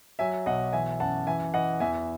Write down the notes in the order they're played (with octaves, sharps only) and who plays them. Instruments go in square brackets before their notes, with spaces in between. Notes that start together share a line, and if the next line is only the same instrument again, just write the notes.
[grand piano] F#3 E5 G#5
B1 D#5 F#5
E3 E5 G#5
F#2 F#5 A5
E3 E5 G#5
E3 D#5 F#5
E2 E5 G#5